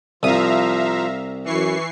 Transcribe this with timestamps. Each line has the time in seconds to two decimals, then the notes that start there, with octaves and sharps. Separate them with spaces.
0.23 C2 F3 E5 F5 A#5 D#6
1.45 F#2 E3 C#6 C7